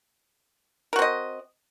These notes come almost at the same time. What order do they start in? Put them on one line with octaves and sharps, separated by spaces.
A#4 F#4 C4 D#5